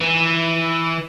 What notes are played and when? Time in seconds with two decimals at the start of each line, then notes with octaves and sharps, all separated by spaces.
0.01 E3